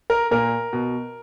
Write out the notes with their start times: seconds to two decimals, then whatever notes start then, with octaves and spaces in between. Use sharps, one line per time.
0.10 A#4
0.31 A#2 A#4
0.73 B2